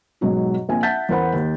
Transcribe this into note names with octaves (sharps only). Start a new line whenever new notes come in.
G#2 B2 F#3 F#4
A#1 C4 F4 G#5
E5 F#5 A5 G6 A6 B6
E2 A#4 C5 F#5 B5
D#2